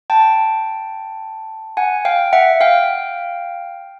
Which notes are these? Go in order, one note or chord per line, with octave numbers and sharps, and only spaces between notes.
G5 A5
F#5 G#5
F5 G5
E5 F#5
F5 G5